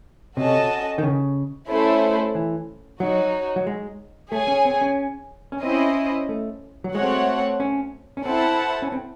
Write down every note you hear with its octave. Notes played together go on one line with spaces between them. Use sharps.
C3 C#4 F#4 A4 D#5 A5
D#3
C#3
A3 C#4 E4 A4 C5
E3
F#3 D#4 F#4 C#5
F#3
G#3
A3 G#4 C#5 G#5
C#4
C4
C#4
C#4
C4 C#4 E4 C5 D#5
A3
F#3
G#3 A3 C4 F#4 C#5 F#5
C#4
C#4
C4 E4 A4 C5 F#5 A5
C#4
C4